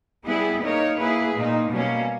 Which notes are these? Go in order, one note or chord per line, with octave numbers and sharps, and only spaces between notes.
G3 B3 E4 G#4 B4
A#3 D#4 A#4 C#5
A#3 E4 G#4 B4
A#2 A#3 D#4
B2 G3 A#3 C#4